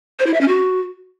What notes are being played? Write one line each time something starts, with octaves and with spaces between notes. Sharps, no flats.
C5
E4
E5
C#4
F#4